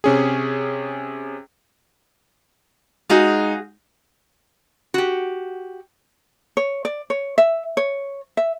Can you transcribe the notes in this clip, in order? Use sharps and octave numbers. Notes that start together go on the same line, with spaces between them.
C3 C#4 G#4
G#3 D#4 F#4 G#4 F5
F#4 G4
C#5
D5
C#5
E5
C#5
E5